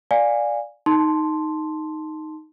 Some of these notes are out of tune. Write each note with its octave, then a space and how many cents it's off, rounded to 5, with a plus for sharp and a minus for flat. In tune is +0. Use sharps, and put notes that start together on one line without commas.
D5 +0 F5 +10 G#5 -15
D#4 +0 A5 +0 C6 +0